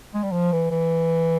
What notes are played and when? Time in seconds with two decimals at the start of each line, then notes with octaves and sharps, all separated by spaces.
0.14 G#3
0.23 G3
0.32 F3
0.52 E3
0.71 E3